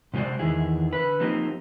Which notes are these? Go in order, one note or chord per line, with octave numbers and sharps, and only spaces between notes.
C3 G#3 F#4 C5 D5
E2 D#3 E4 G#4
D3 B4
F3 A#3 C4 D#4 G4